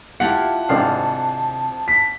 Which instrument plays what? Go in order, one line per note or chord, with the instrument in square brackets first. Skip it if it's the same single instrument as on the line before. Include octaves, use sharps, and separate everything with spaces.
[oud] E4 F4 F5 [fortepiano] G4 [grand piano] F#5 [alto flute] A5
[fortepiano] G#1 D4 F5 [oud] C3
[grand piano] B6